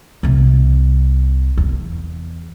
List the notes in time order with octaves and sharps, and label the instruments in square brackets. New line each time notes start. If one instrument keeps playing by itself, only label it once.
[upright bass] C2 C3
E2